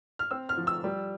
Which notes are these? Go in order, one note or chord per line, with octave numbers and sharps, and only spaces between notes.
F6
C4 E6
F6
F3
E6
G3